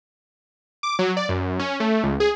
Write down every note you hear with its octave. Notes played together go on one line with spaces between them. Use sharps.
D6
F#3
D5
F#2
C#4
A3
C#2
G#4